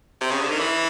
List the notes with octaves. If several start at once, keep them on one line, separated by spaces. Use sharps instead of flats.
C3
C#3
D3
D#3
E3